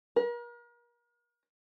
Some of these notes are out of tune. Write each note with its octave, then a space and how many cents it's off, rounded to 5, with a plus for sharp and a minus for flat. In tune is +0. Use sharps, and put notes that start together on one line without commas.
A#4 +40